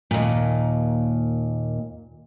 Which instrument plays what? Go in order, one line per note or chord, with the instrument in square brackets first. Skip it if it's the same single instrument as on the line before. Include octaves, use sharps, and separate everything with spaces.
[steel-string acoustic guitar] D#2 A#2